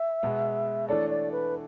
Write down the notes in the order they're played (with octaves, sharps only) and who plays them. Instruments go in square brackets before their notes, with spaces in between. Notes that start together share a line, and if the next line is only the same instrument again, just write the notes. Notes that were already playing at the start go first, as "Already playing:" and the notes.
Already playing: [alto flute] E5
[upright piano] B2 G#3 B3
[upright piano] E3 A3 D4 A4 C#5 [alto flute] D5
[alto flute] D5
B4